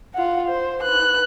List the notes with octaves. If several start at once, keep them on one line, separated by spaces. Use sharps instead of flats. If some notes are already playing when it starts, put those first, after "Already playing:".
F4 F#5
C5
B4 F#6